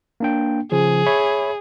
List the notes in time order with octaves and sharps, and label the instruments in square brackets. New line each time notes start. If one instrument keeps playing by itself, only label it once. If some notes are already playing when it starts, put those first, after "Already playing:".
[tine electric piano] A#3 D4 G5
[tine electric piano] C#3 F3 [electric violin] G#4
[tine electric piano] C#5 E5 B5